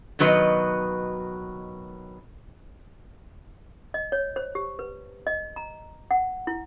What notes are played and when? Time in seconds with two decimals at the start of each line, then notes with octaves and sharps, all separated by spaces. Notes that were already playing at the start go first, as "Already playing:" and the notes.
0.19 B2 D#3 F#3 B4 D#5
3.94 D#5
4.12 C#5
4.36 C5
4.55 G4
4.79 B4
5.27 D#5
5.56 A#5
6.11 F#5
6.47 E4